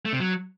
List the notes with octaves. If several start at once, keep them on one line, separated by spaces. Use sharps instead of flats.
A3
C3
F#3